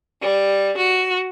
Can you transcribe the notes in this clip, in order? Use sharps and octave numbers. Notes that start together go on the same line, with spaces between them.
G3
F#4